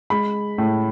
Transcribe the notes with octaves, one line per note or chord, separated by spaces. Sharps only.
G#3 B5
A2